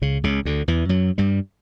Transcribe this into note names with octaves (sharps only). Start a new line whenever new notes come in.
C#2 C#3
C#2 C#3
D2 D3
E2 E3
F#2 F#3
G2 G3